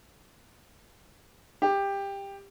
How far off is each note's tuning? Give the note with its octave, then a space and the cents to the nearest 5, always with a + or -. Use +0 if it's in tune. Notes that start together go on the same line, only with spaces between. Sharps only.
G4 +15